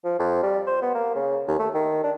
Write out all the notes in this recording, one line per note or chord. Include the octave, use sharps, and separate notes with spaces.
F3
F2
G3
C5
B3
A#3
C#3
D#2
A3
D#3
D4